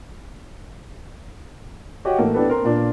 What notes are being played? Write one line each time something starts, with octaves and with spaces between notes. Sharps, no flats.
F#4 G4 C#5 D#5 F#5
A2 E3 A3 A#3
B3 D4 E4 G4 A4 B4
C4 A#4 C6
A#2 D4 F4